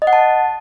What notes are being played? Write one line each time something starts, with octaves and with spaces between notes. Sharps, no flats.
D#5
F#5
A5